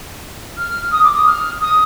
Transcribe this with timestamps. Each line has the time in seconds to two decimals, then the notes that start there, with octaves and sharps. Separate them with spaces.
0.57 F6
0.91 D#6
1.03 D6
1.15 D#6
1.26 F6
1.60 D#6